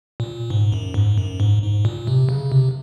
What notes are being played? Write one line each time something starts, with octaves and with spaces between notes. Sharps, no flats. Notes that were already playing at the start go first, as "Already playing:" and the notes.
A#2
G#2
F#2
G#2
F#2
G#2
G#2
A#2
C3
C#3
C3